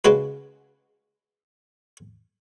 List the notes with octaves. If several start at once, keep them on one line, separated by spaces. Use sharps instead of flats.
C#3 G#3 F#4 B4